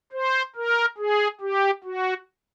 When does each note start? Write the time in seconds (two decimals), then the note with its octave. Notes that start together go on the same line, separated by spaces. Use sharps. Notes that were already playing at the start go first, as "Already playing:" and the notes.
0.13 C5
0.56 A#4
0.98 G#4
1.41 G4
1.84 F#4